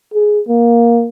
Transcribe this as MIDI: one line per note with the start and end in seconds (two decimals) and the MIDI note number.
0.14 0.40 68
0.48 1.08 58